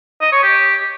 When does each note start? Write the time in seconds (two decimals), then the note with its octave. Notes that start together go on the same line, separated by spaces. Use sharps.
0.21 D#5
0.32 C#5
0.43 G4